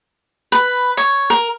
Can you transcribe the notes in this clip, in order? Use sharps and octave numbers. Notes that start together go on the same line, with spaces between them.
B4
C#5
A#4